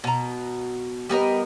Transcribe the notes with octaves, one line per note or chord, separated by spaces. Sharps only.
B2 A#5
G3 B3 A#4 D#5